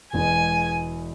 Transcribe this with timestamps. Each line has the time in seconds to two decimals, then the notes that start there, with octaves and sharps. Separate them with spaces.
0.13 E1 E2 B2 G#3 B3 G#5